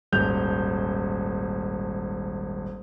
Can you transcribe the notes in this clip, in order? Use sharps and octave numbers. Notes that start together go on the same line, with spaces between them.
D#1 G#1 G6 F7